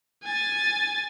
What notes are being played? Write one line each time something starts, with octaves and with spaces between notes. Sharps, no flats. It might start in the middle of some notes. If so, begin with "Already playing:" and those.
G#5 A6